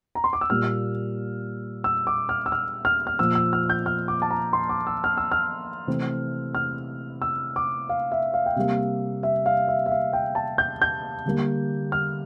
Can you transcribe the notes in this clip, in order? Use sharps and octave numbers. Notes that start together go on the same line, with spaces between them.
A#5
C6
D6
E6
A#2 G3 A#3 F6
E6
D6
F6
E6
F6
F6
F6
A#2 F3 A#3 E6
E6
F6
G6
F6
D6
A5
A#5
C6
D6
E6
F6
E6
F6
C3 E3 A3 C4
F6
E6
D6
F5
E5
F5
G5
C3 G3 A#3 F5
E5
F5
E5
E5
F5
G5
A5
G6
G6
D3 G3 A#3
F6